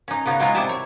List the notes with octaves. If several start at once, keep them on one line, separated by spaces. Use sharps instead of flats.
C#4 D#4
C#3 B3 C#4 D#4
F#3 G#3 D#4 F4 C#5
C3 G3 E4 C5 E5 A5
C#5